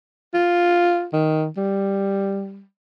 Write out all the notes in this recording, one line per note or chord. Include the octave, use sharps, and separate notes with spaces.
F4
D#3
G3